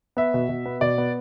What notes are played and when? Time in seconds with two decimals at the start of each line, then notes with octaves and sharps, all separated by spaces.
0.17 B3 E5
0.34 B2
0.49 B2
0.66 B3
0.81 B2 D5
0.98 B3